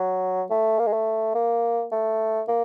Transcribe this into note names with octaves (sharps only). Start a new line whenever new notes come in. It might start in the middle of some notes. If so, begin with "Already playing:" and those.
Already playing: F#3
A3
A#3
G#3
A3
A#3
A3
A#3